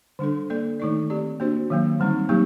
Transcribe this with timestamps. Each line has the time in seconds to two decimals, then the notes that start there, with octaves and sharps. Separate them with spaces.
0.19 D3 G3 D4 A4
0.50 A#3 D4 A4 D5
0.80 D#3 A3 D#4 A4 D5
1.10 C4 G4 D5
1.40 A#3 D4 F#4 C5
1.70 D#3 F#3 A#3
2.00 D3 G3 C4 D#4
2.29 F#3 A#3 D#4 G4